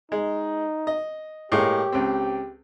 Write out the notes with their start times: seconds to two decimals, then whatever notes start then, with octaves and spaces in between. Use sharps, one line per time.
0.12 G#3 D#4
0.87 D#5
1.52 A2 G#3 A#3 G4
1.92 C#2 C4